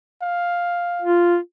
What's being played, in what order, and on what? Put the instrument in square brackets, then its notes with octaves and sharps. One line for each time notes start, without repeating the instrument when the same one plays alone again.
[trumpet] F5
[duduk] F4